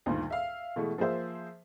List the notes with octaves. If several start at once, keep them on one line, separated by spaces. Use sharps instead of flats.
D2 G2 A#2 D#3
E5 F5
B2 E3 G#3 A3
F3 A#3 G#4 C5 E5